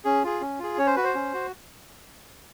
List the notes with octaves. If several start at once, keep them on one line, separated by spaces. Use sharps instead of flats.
C#4 G#4
F4 G#4
C#4
F4 G#4
C#4 C#5
C5
F#4 B4
C5
C#4
F#4